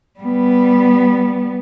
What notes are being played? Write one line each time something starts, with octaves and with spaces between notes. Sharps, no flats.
G3 B3